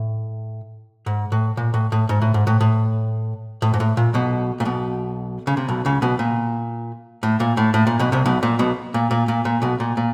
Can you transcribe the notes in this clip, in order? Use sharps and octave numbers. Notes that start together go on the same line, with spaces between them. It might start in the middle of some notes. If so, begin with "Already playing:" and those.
Already playing: A2
G#2
A2
A#2
A2
A2
G#2
A2
G#2
A2
A2
A2
G#2
A2
A#2
B1 B2
A#2
B1 B2
C#3
C3
B1 B2
C#2 C#3
B1 B2
A#2
A2
A#2
A2
A2
A#2
B1 B2
C2 C3
B1 B2
A#2
B1 B2
A#2
A#2
A#2
A#2
B1 B2
A#2
A#2